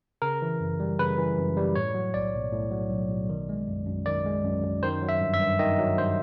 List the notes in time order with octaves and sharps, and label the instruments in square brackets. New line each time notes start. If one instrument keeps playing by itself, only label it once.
[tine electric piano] C#3 A#4
E3
F#2
G3
C#3 B4
E3
F#2
G3
A2 C#5
F#3
B1 D5
B1
A2
F#3
B1
B1
D#3
G#3
F#2
F#2
D#3 D5
G#3
F#2
F#2
D#3 C5
F#3
E5
G2
E5
G2
D#3 D#5
F#3
G2 C5